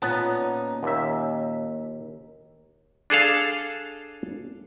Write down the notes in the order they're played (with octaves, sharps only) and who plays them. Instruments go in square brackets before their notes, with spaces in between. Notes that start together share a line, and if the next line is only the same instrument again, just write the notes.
[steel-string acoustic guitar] A#2 C#4 D#4 [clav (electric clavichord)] B3 A5
[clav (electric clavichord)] D#2 E5
D4 G#4 A4 F5